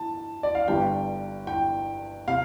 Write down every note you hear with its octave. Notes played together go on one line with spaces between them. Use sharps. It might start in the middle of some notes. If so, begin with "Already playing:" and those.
Already playing: A5
D5
F5
G1 G2 G3 G5
G5
C3 F5